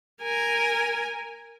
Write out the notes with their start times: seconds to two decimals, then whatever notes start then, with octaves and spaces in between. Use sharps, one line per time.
0.23 A#4 G#5